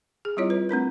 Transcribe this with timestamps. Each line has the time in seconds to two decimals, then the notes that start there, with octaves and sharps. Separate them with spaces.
0.25 G#4
0.37 G3 C4 E4 F4 C#5 D#5
0.50 B4
0.69 A3 C4 D4 A#4